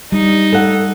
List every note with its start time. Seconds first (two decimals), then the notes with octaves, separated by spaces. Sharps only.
0.12 G3 D#4
0.52 A4 F#5